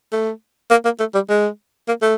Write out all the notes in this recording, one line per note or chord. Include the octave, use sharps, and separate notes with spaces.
A3
A#3
A#3
A3
G3
G#3
A#3
A3